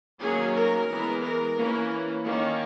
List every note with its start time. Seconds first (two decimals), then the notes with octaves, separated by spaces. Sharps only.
0.21 D#3 F#3 A#3 C#4 G#4
0.56 A#4
0.89 E3 G#3 B3
1.23 A#4
1.57 E3 A#3 C#4
2.24 D#3 A#3 C#4